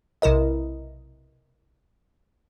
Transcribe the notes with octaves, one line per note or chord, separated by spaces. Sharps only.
B1 C3 E4 A#4 D#5